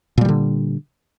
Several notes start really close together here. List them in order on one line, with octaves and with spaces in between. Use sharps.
A#2 G3 D#3 D3